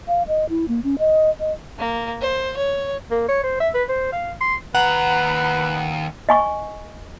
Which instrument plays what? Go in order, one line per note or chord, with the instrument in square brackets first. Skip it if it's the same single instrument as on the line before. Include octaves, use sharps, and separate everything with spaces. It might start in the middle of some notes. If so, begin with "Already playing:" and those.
[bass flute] F5
D#5
E4
A#3
C#4
D#5
D#5
[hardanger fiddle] A#3
C5
C#5
[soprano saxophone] A#3
C#5
C5
E5
B4
C5
F5
C6
[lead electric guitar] D#2 A#5 [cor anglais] B4 [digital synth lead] F#5
[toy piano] D#5 G#5 C#6